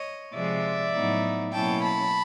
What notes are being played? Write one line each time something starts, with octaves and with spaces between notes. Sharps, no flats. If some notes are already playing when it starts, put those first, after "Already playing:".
Already playing: C#5 D#5
C3 F3 G#3 D5 E5
A2 F#3 B3 D#4
B2 F#3 A#3 C#4 E4 G5 A5
A5 B5